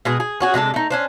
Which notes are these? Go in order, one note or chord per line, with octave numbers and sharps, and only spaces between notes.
B2 G#3 G#4
G#4
C#4 F#4 G#4
C3 G#3 D4 A4
A3 D#4
C#4 D4 C5